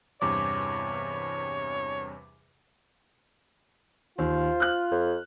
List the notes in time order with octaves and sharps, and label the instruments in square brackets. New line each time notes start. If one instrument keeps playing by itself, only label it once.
[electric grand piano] E2 G2 C3 [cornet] C#5 [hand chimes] D6
[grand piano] D#2 [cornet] F4 [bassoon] C5
[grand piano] F6 F#6
[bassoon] F2